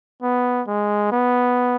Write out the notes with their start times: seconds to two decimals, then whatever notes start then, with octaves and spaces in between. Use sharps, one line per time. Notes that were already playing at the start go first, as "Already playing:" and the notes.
0.22 B3
0.67 G#3
1.12 B3